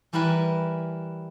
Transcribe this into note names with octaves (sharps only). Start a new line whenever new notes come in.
E3 G3 E4 A#4 B4 G#5